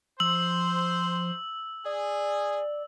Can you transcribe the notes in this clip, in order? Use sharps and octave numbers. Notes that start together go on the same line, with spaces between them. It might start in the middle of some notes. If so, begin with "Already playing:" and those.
F3 C5 E6 F#7
G#4 D5